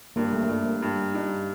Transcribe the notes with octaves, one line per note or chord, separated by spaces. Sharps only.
G2 A#3
A3
A#3
G2 A3
A#3
G2
G2 D#4